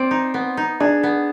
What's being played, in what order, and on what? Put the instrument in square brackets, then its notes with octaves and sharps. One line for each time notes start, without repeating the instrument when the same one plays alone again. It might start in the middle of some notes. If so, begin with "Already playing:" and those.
Already playing: [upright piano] C4 [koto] D5
[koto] D#4
B3
D#4
[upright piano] D4 [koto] G#4
[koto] B3